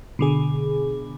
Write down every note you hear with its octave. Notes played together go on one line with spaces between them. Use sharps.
B2 D3 G#4